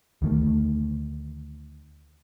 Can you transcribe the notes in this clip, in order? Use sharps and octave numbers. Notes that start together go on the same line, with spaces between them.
D2 D#3 A3